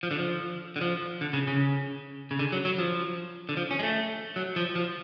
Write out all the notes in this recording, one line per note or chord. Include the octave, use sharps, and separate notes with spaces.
F3
D3
F3
D3
F3
D3
C#3
C#3
C#3
D3
F#3
F#3
F3
D3
F3
C#4
G#3
A3
F#3
F3
F3